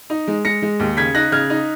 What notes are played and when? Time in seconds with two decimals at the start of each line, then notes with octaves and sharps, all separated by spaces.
0.10 D#4
0.28 G#3
0.45 G#3 A#6 C#7
0.62 G#3
0.80 D#2
0.97 C#3 G#6 B6
1.14 D#4 F#6 A#6
1.32 C#3 F6 G#6
1.50 D#4